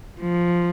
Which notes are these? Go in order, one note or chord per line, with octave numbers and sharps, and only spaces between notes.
F3